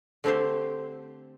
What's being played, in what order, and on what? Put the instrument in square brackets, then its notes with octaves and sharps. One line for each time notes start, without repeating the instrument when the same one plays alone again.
[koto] D3 A3 C4 G4 C5